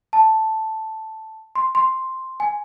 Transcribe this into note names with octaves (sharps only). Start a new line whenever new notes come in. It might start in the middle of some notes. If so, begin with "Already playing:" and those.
A5
C6
C6
G#5